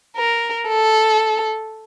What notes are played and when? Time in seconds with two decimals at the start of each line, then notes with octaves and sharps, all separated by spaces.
0.17 A#4
0.69 A4